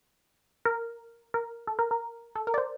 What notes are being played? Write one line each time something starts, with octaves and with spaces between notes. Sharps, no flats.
A#4
A#4
A4
A#4
A#4
A4
A#4
D5
C5